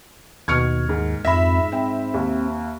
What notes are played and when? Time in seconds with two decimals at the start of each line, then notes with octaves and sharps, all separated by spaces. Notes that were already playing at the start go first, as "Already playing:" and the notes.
0.48 D#2 B2 C#6 F6 G#6 C#7
0.89 G#2 D#3
1.25 F2 G#2 E5 B5 A#6
1.72 C4 G5
2.14 D#2